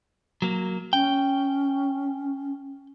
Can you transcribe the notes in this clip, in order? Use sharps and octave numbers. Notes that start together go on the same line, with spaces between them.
F#3 A#3
C#4 G5